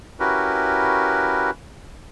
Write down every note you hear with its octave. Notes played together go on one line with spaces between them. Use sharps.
C#4 E4 F#4 G4 A#4 B4